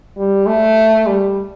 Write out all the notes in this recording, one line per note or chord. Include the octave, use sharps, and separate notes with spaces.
G3
A3
G3